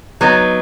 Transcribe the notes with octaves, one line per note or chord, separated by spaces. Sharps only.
F#3 B3 D#4